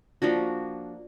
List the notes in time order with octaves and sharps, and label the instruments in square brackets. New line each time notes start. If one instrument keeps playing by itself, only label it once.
[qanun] F3 A#3 D4 F#4